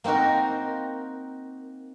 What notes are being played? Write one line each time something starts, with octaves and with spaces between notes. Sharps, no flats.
A#3 C4 D#4 F#4 A#4